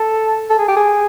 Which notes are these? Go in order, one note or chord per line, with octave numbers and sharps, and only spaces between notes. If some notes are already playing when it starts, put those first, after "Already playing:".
Already playing: A4
A4
G#4
G4
G#4